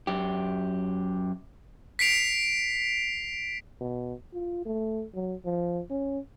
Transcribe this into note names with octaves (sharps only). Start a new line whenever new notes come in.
F#2 G4
B6 C7 D7 F7
B2
F4
A3
F#3
F3
C#4